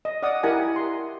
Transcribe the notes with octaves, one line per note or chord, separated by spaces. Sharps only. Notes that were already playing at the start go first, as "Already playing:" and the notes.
D#5
D5 D#5 F#5 D#6
E4 G4 A#4 F#5 G#5
C6